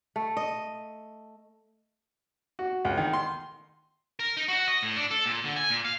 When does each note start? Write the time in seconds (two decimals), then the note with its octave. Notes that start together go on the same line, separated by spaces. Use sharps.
0.16 A3
0.37 D#5
2.59 F#4
2.85 C#2
2.98 D#3
3.13 C6
4.20 A#4
4.37 D#4
4.49 F#4
4.67 D#5
4.83 A2
4.96 D4
5.11 A4
5.26 A#2
5.45 D3
5.56 G#5
5.70 A#2
5.85 F5